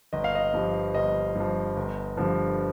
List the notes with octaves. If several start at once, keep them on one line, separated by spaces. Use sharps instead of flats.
G1 D#5
F5
D#5
G2 F3
G1 D#5
G2
F3
G1
G2 D3 F3